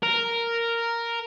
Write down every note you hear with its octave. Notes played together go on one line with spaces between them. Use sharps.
A#4